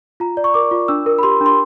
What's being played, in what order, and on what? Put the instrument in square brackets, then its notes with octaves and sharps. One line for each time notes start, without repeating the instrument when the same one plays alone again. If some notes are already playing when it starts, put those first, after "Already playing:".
[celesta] F4 A#5
D5
C#6
A#4 D6
F4
D4 E6
A#4
B5
G4 C6
D4
C6